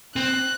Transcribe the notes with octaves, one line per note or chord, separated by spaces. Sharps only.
C4 F#6